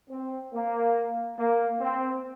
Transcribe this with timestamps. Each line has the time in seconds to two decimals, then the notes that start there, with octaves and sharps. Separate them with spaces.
0.10 C4
0.54 A#3
1.38 A#3
1.80 C4